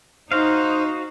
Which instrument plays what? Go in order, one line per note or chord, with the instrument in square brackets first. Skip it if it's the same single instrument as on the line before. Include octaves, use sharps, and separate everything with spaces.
[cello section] D#4 [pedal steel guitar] F#4 F5 [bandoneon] C5